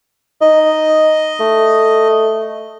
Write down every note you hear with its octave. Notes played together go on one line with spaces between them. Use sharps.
D#4 D#5
A3